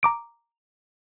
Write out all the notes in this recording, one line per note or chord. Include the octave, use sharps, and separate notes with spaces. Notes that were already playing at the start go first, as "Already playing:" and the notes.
A#5 D6 D7